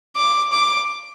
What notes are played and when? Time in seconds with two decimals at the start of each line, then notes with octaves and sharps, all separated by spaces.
0.16 D6
0.52 D6